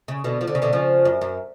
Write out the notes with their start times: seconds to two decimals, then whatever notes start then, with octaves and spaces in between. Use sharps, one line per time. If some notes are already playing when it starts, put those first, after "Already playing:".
0.08 C#3
0.24 B2 D3
0.41 F3
0.47 D3
0.55 C#3
0.62 B2 D3
0.73 C#3 F3
1.05 F#2
1.21 F#2